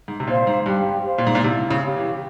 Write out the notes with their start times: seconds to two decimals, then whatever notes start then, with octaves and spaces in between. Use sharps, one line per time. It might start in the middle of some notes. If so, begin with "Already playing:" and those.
0.08 G#2
0.20 C3
0.27 A#2 C5 F5
0.47 G#2
0.66 G2 G4
1.05 C5 F5
1.18 A#2
1.27 G#2
1.35 A#2
1.44 C3 E4
1.71 C#3
1.83 G4 C#5 F5
1.96 E3